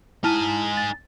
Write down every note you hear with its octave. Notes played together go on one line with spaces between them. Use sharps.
D#4 E4 G#5 A5 F6
A6